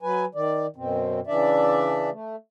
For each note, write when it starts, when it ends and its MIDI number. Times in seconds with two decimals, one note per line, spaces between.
0.02 0.25 54
0.02 0.25 71
0.02 0.25 80
0.35 0.67 51
0.35 0.67 74
0.76 1.20 42
0.76 1.20 47
0.76 1.20 60
1.27 2.10 49
1.27 2.10 52
1.27 2.10 62
1.27 2.10 74
1.27 2.10 76
2.11 2.36 57